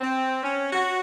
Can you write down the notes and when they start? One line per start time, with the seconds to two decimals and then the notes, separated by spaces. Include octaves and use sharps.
0.01 C4
0.44 C#4
0.72 F#4